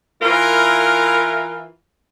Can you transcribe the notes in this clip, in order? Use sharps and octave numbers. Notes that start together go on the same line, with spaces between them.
E3 E4 F4 A#4